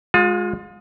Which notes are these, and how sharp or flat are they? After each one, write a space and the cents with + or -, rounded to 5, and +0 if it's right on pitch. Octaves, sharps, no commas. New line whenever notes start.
G#3 +0 F4 +35